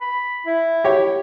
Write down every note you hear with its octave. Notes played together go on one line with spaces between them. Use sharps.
B5
E4
G4 C#5